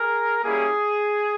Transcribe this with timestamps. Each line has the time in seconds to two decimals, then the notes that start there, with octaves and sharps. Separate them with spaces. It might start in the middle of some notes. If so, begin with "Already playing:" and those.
Already playing: G#4 A#4
0.43 G3 A#3 C#4 E4 G#4